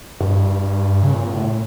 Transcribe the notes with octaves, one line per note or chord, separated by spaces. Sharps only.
G2
C#3
A#2
A2